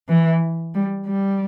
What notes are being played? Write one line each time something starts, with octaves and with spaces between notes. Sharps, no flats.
E3
G3
G3